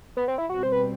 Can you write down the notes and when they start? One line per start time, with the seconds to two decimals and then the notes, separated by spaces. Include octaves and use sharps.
0.17 B3
0.28 C4
0.38 E4
0.49 B2 G3 C4 F#4
0.63 C5
0.72 B4